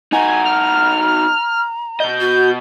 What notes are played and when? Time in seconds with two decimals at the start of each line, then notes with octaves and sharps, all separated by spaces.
0.13 D#4 F#4 G#5 A#5
0.45 F6
2.00 B2 D#5 G6
2.20 F#4